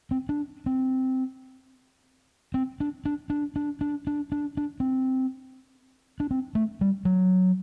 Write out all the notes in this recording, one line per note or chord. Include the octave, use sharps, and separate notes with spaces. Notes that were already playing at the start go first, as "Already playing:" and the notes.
C4
D4
C4
C4
D4
D4
D4
D4
D4
D4
D4
D4
C4
D4
C4
A3
G3
F#3